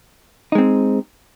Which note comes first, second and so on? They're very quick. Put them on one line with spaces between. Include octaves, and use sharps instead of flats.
D#4 G#3 C4